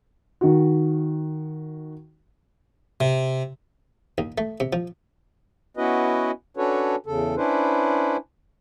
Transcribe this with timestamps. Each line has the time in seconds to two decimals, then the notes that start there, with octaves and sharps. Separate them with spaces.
0.41 D#3 F#4
3.00 C3
4.18 D#2
4.38 A3
4.60 C3
4.73 F3
5.77 B3 C#4 E4 F#4 B4 D#5
6.57 C#4 D4 F#4 A4 B4 C#5
7.06 E2 C#3 A4
7.36 C#4 D4 E4 B4 C5